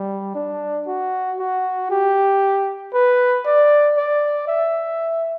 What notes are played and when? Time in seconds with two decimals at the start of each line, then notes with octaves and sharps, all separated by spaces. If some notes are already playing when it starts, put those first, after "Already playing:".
Already playing: G3
0.35 D4
0.87 F#4
1.39 F#4
1.90 G4
2.94 B4
3.45 D5
3.97 D5
4.48 E5